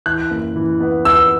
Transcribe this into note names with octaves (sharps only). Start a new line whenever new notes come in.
E3 F#6
F#1
E3
B3
B3 E6